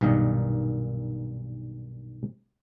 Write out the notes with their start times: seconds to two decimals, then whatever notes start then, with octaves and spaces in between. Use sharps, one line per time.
0.01 B1 G2 A#2 D#3 A#3 D#5